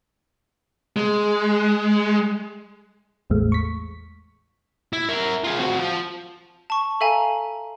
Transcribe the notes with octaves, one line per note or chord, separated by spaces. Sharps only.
G#3
A1 E2 A2 G#3 A3
C#6 B6
E4
A#4 E5
F4 G#4
C4 F#4
F3
A5 C#6
A4 E5 F5 G#5 A#5